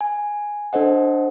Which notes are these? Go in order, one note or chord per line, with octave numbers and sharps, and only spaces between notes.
G#5
D4 A4 C5 D#5 F#5